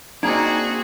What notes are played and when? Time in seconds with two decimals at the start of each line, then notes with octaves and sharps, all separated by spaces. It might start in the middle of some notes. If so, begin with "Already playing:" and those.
0.23 A#3 C4 D4 D#4 F#4 G#4 G#5